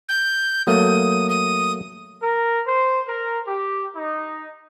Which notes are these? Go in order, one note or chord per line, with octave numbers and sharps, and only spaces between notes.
G6
F#3 A3 A#3 D#6
D#6
A#4
C5
A#4
G4
D#4